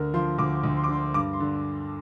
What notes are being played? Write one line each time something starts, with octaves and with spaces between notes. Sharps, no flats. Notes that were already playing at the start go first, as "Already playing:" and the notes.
Already playing: D2 D3 A#4
F3 C6
D2 D6
D2
C6
D6
D3 C6
G2 D6
C6
D3